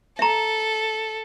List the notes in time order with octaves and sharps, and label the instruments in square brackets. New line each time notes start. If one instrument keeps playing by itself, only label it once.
[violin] A4 [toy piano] E5 A#5